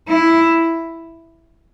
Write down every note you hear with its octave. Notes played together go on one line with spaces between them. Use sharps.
E4